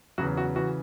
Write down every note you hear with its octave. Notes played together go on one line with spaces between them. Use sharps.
E2 C#3 F#3 F#4
F#4
C#3 E3 F#4